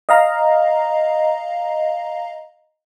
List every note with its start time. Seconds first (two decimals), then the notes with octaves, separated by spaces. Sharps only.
0.09 D#5 F5 A#5